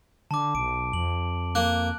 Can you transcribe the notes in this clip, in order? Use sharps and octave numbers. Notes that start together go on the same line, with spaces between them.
D3 A5 D6
B1 D7
F2 F#7
A#3 F#6